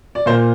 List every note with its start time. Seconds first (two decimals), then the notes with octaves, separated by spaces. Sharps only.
0.15 D5
0.26 A#2 A#3 C5